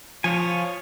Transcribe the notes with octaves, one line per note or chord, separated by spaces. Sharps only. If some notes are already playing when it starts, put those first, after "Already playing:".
F3 F4 C#5 G#5